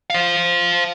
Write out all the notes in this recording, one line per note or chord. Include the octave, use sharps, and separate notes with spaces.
C5 F5